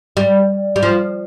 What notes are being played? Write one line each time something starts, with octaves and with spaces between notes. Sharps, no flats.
G3
G3
F3